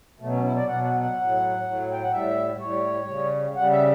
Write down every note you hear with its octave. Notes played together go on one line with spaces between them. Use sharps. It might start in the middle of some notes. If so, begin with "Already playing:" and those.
B2 F#3 A3
C#4
E4
D5
B2 F#3 F#5
F#5
F#5
A2 F#3
A2 F#3
G5
F#5
A2 G3 E5
A2 G3 C#5
C#3 G3
C#3 G3 F#5
E5